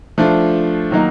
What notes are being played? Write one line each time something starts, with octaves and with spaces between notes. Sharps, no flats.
F3 A3 D4 F4
D#3 F#3 A#3 D#4